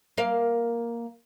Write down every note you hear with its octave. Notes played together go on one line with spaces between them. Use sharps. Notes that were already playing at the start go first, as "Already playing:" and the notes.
A#3 F5